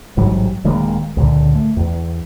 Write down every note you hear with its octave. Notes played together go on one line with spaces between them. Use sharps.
A1 G#2 F#3 G3
D#1 D#3 G#3 A#3
C#2 A#2 D3
A3
E2